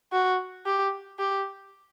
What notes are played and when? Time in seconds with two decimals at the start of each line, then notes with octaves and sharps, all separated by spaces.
0.12 F#4
0.66 G4
1.19 G4